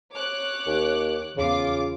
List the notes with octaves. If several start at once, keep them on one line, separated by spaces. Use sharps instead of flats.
C#5 D6 F#6
D#2
E2 C#3 F4 D6